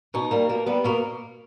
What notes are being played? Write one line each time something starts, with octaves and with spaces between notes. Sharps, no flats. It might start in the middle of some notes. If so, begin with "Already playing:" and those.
B2 D#4
G3 A#3
B2 A#3
G3 B3
B2 A#3